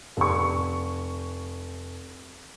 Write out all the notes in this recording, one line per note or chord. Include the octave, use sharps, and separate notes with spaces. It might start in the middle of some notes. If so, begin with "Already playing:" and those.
F1 C#6